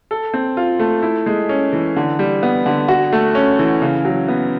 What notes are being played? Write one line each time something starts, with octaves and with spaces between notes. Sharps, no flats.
A4
C4
F4
A3
E4
G#3
C#4
E3
D3
G3
B3
D3
F#4
A3
C#4
E3
C#3
F#3
B3